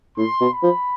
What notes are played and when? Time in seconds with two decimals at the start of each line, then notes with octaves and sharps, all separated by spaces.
0.18 A2 C6
0.40 B2
0.52 B5
0.63 F3